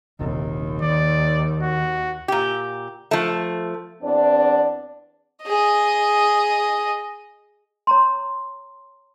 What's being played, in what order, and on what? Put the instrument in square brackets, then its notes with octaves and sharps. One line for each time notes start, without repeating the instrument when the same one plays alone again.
[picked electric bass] D#1 A#1 C3 [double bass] D#2
[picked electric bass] D#3 [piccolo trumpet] D5
[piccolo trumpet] F#4
[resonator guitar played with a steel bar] A#2 G4
F3 A3
[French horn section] E2 C4 D4 D5
[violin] G#4 D#5
[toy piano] C#5 A#5 C6